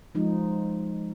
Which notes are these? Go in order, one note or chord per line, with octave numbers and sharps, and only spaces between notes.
F3 G#3 D#4